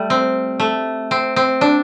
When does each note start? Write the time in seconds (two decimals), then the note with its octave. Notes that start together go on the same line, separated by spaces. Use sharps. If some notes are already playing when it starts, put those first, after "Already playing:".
Already playing: G3 A3
0.10 C4
0.60 A3
1.11 C4
1.36 C4
1.61 D4